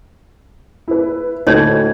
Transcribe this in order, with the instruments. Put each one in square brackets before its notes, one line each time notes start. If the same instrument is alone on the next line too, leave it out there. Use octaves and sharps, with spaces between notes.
[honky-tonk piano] E4 B4
[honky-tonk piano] D2 A2 G#6 [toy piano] D#4 C#5 D#5